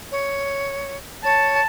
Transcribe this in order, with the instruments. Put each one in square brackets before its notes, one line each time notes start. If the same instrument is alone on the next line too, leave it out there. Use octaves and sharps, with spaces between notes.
[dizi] C#5
[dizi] C#5 [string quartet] A5